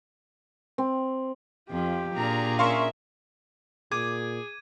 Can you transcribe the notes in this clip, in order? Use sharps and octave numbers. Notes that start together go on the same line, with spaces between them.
C4
F2 F3 G4
A#2 D4 G#4 A#5
C#4 A#4 E5 F5 C6 C#6
A#2 G#4 D6 G#6 D#7